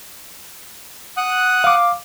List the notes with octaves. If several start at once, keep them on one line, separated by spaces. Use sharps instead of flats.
F#5 D#6 F#6
F5 D6